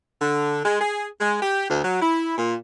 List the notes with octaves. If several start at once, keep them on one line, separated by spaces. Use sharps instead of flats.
D3
G#3
G#4
G#3
G4
D2
F#3
E4
A#2